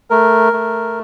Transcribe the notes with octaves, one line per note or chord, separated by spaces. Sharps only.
A3 A#4
A3